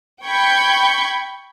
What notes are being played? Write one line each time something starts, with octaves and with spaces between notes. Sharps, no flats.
G5 B5 C#6 G6 G#6